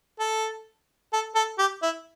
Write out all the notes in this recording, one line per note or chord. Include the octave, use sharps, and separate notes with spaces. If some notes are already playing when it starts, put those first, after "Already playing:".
A4
A4
A4
G4
E4